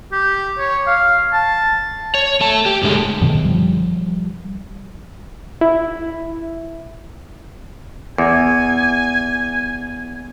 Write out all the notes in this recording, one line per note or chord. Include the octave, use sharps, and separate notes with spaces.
G4
C#5
F5
A5
C#5
A3 A5
G4
A2 D3 G#3 A3 G#4
F#2 B2 D3 D#3
F3 G3
E4
E2 G#5